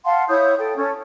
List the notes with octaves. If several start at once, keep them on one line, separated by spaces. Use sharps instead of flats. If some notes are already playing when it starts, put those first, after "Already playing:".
F5 F#5 A5 C6
E4 C#5 D#6 G6
A4 G5
C#4 A4